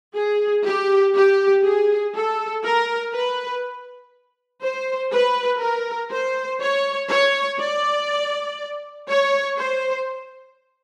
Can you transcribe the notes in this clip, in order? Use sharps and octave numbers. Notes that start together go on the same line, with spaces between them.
G#4
G4
G4
G#4
A4
A#4
B4
C5
B4
A#4
C5
C#5
C#5
D5
C#5
C5